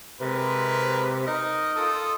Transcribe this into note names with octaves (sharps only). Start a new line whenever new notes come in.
C3 G#3 A#4 B4
D#4 A#4 D#5
F4 A4 D#6